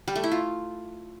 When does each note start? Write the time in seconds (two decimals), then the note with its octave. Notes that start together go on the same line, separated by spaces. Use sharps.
0.08 G3
0.16 A3
0.24 E4
0.32 F4